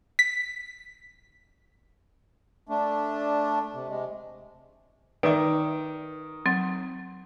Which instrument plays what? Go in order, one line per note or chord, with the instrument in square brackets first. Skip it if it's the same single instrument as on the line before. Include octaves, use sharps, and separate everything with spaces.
[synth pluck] B6
[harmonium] A3 D4
C3
C3 G#3
[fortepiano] D#3 [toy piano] B4 D6 [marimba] D5 E5
[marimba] F#3 C4